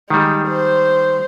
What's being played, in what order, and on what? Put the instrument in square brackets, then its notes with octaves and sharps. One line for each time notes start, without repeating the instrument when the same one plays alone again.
[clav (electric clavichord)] D#3 G3 [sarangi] G#3
[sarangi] C5